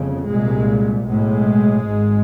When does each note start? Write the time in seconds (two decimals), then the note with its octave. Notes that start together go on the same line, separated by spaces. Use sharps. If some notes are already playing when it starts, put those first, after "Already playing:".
Already playing: G1 F2 C#3
0.27 C2 A#2 G#3
1.06 B1 A2 G#3
1.84 G#1 G#2